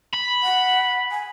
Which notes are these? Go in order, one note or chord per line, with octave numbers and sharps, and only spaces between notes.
B5
F#5
G#5